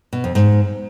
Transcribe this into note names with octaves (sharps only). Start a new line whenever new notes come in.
B2
F2
G#2